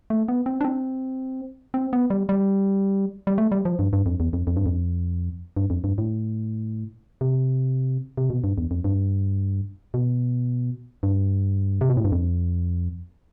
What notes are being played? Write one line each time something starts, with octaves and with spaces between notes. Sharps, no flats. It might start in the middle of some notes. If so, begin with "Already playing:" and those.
A3
B3
C4
D4
C4
C4
B3
G3
G3
G3
A3
G3
F3
G2
G2
F2
E2
F2
F2
G2
F2
G2
F2
G2
A2
C3
C3
B2
G2
E2
F2
G2
B2
G2
C3
B2
A2
G2
F2